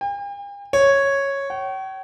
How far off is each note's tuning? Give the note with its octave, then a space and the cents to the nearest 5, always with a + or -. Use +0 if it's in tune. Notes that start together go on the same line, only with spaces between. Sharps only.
G5 +45
C#5 -5
G5 -45